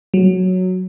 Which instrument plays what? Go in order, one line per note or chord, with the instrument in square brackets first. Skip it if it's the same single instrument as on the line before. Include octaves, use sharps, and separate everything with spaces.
[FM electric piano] F#3